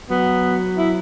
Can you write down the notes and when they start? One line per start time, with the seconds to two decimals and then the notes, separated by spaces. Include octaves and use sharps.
0.10 F#3 B3
0.78 E4